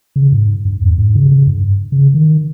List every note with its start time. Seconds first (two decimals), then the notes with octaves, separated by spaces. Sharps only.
0.16 C#3
0.32 G#2
0.65 G2
0.82 E2
0.98 G#2
1.15 C#3
1.31 C#3
1.47 G2
1.92 C#3
2.14 D#3